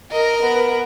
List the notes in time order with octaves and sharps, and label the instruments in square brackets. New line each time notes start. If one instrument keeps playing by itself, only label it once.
[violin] A#4 [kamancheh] D#5
[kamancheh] B3 B4